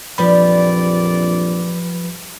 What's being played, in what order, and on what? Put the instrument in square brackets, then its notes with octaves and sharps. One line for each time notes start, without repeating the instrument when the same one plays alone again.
[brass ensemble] A#1 F2 D5 [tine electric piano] F3 B4 B5 [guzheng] G3